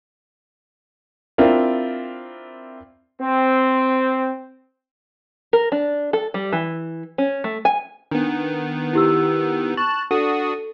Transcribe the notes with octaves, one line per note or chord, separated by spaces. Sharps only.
C4 D4 E4 F4 A#4
C4
A#4
D4
A4
G3
E3
C#4
A3
G#5
D#3 B3 D4
E4 G4 E6
A5 C#6 F#6
D4 F#4 A4 D#6